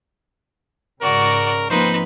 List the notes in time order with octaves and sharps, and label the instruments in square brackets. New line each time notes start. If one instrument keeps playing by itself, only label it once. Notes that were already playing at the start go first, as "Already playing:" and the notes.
[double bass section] G#2 C#3 [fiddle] F#4 D5 [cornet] A#4
[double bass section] F3 A#3 C4 [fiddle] D#4 B4 [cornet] C5